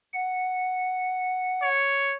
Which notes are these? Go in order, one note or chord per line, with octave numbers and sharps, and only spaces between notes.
F#5
C#5